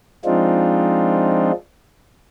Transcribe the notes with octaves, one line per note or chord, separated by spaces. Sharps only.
F3 G#3 C4 D4 D#4 F4